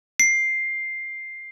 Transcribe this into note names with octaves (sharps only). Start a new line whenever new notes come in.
C7